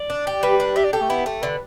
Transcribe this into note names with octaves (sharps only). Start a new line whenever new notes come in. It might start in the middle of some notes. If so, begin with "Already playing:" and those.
Already playing: D5
D4
G4
G3 B4
D4
G4 E5
D5
G4 A4
A3
B3 E4
A3 A4
D3 B4